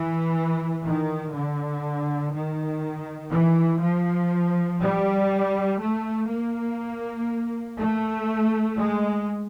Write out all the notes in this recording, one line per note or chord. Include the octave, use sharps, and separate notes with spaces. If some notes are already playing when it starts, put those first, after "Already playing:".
Already playing: E3
D#3
D3
D#3
E3
F3
G3
A3
A#3
A3
G#3